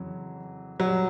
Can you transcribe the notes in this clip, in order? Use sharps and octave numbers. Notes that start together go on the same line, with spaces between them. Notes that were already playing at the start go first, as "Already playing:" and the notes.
Already playing: F2 C#3 E3 F#3
F#3
G3